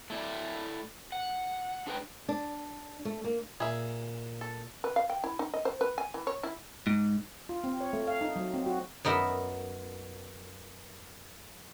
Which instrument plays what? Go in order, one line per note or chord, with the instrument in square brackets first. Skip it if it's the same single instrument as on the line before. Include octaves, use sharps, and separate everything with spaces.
[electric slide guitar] A3 E4 D5
F#5
D4 G#4 B4 G5
[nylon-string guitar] D4
A3
A#3
[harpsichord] A#2 [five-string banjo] G#4 E5
[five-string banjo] A4
[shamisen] B4
F5
G5
E4
D#4
D#5
C5
B4
G#5
E3
C#5
E4
[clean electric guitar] G#2
[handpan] F4
C4
C#5
A3
F5
D#4
F#3
C4
F#4
[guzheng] F#2 B3 D#4 A#4 E5